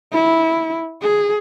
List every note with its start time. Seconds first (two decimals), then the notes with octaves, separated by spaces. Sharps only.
0.13 E4
1.02 G#4